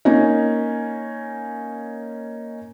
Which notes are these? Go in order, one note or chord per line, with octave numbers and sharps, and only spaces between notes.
A#3 C#4 D#4